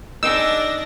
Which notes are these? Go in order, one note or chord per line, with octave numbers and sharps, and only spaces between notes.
D4 D#4 G#4 E6 A#6